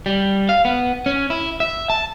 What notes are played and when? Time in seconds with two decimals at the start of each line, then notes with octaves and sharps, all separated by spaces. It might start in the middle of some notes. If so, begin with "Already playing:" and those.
0.06 G3
0.49 F5
0.65 B3
1.06 C#4
1.30 E4
1.60 E5
1.90 A5